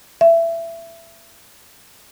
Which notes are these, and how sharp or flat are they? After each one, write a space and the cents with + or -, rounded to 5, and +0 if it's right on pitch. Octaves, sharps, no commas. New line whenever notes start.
E5 +20